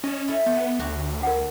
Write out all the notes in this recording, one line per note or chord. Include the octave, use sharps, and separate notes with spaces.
C#4 D#5 A5
E4 A4
B3 A4
D2 F#4 G4 C#5
A#4 F#5